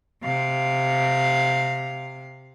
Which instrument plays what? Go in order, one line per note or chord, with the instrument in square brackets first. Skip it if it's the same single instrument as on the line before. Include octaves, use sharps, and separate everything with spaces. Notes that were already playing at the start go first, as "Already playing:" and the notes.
[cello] C3 F5